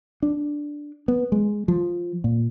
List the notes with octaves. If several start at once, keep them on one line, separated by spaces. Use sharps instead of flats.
D4
B3
G#3
F3
A#2